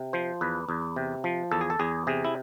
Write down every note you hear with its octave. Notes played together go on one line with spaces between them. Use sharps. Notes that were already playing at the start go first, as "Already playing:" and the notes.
Already playing: C3
F3 C5
E2 B4
E2
C3
F3
E2 A4
G#4
A4
E2 G#4
C3 G#4
E4